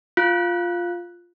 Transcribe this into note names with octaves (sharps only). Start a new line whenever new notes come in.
F4 F#6